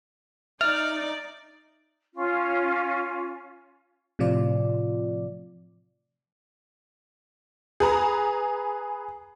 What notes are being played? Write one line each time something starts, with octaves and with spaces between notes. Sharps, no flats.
D#4 D5 E5 F6
C#4 F4
A2 C3 F3 F4 D5
G#4 B4 A#5